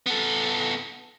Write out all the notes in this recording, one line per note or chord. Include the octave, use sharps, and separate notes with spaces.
B3 A4